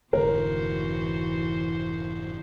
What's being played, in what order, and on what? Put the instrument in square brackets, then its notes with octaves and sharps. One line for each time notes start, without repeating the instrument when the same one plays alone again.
[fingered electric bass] F1 G#2 D3 [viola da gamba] E3 F#4 C5 [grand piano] A#4